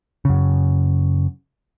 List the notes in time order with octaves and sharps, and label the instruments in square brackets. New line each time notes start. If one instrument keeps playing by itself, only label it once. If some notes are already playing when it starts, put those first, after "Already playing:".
[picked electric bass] F#2 C#3